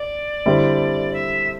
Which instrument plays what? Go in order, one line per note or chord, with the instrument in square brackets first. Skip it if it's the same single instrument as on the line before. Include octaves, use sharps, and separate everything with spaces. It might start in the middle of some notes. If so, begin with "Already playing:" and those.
Already playing: [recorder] D5
[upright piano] D3 G3 C4 E4
[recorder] E5